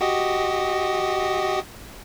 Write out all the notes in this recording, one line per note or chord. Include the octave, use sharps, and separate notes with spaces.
F#4 G4 D#5